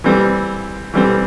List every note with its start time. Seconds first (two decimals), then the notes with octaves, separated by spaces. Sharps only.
0.04 E3 G3 C4
0.94 E3 G3 C4